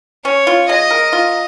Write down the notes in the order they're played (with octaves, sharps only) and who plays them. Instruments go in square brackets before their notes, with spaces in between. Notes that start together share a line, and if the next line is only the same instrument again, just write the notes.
[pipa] C#4 [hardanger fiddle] C#5
[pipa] F4
[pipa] G#3 [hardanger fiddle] D#5
[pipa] A#4
F4